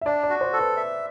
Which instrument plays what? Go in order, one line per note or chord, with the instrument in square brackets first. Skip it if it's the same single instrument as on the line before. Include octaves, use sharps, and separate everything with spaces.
[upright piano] E5
[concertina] D4 [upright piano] D5
[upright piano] D5
[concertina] F#4
[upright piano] C5
[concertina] A4
[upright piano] B4
[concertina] E5